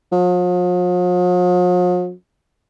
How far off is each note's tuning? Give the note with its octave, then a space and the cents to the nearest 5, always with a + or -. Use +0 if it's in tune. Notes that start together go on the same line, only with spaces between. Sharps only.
F3 +45